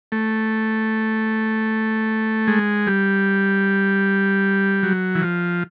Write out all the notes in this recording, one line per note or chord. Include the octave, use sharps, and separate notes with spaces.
A3
G#3
G3
F#3
E3
F3